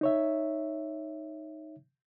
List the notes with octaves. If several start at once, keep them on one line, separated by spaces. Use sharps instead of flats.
D#4 C#5 E5